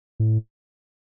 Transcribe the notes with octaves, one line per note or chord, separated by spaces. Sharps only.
A2